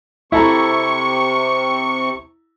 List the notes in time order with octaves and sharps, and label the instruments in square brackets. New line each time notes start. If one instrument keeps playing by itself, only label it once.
[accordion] C3 C#6 [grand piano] E4 A4 A#5